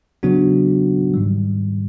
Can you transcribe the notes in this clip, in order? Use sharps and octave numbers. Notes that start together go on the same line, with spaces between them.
C#3 F#3 B3 D4 F#4
G#2 D#3 G3